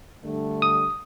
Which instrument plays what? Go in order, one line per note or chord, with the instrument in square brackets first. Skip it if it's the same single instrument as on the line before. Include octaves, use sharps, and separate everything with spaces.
[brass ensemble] D3 G3 A3
[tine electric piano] D#6